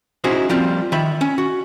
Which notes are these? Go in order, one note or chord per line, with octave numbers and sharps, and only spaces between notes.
C#4 D#4 E4 F#4 G#4 C5
F3 G3 A#3 C4 F4
D#3 E5 B5
C#4
F#4